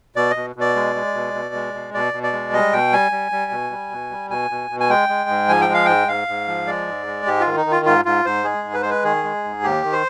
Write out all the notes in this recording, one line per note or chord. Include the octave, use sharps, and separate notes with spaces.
B2 D5
D#5
B2
B2
D5
G#3
G#3
B2
B2
G#3
B2
B2 D5
B2
D5
G#3
G3 D#5
B2 G5
G3 G#5
G3
G3
B2
G3
B2
G3
B2 G#5
B2
B2
G#5
G#3 G5
G#3
G#2
F3 G#5
G5
G#3
F5
G#2 G5
G#2 F5
G#2
F3
G#3 D5
G#2
G#3
G#2 G4
F4
D#3
D#4
D#3
F4
G#2 F4
G#2 F4
G#2 C5
G#3 G#4
G#2
B4
G#3 C5
B4
D#3 G#4
G#3
G#2
D#2 G4
D#3
C5